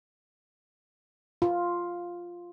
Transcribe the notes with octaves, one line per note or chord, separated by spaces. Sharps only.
F4